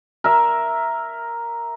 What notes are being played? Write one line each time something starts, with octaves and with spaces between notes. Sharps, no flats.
A#4 E5